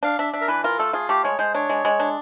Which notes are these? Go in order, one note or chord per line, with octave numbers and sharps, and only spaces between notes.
D4 F5
D4 E5
D4 E5
A#4
E3 B4
F4 A#4
A3 A4
F4 G#4
A3 G4
G#3 C#5
G#3 C5
D4 C#5
G#3
G#3
D4